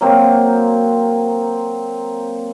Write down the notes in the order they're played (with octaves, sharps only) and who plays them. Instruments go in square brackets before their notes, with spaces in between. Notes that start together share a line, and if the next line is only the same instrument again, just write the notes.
[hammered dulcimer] F#3 A#3 C4 F#4